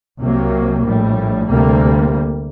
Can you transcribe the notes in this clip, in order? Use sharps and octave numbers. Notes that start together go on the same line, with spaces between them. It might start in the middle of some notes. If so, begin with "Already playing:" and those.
C2 C3 F#3 A#3
A#1 A2 G3
D2 C3 G3 A#3